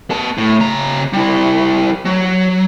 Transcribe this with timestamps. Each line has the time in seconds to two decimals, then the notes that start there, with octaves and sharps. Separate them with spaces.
0.10 B3 A5
0.38 A2
0.60 C#3 A#5
1.13 G3 E4
2.05 F#3